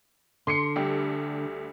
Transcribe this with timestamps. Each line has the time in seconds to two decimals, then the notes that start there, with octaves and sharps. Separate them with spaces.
0.47 D3 C6 C7 C#7
0.76 D2 G3 G4